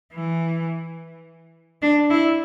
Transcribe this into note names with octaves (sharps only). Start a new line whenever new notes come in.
E3
D4
E4